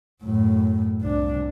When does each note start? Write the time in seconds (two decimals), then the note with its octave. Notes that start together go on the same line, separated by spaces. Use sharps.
0.24 F#2 A2
1.01 C2 D4